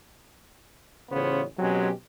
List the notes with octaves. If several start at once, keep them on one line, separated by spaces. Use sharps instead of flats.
A1 C#3 B3 F4 C5 C#5
B2 F#3 G#3 C4 C#4 G4